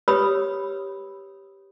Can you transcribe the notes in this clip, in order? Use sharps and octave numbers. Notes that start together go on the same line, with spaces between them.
G4 B4 C#5 B5 D#6 E6